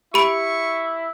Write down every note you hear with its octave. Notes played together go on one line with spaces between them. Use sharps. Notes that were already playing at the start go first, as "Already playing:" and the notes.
E4 G4 B5 C#6 D7